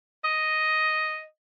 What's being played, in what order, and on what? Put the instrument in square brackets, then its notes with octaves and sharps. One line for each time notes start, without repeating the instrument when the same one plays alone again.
[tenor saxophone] D#5